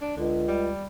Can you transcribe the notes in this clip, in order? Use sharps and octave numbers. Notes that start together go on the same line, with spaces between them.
D4
C#2 D3
G3